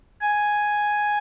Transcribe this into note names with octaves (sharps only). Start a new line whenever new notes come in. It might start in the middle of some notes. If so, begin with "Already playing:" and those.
G#5